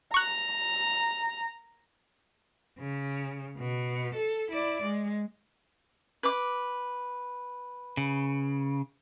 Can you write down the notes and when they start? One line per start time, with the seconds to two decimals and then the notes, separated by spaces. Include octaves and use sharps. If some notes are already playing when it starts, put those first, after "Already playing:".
0.14 A#5 C#6 F#6
2.79 C#3
3.57 B2
4.14 A4
4.50 E4 D5
4.82 G#3
6.23 B4 D6
7.97 C#3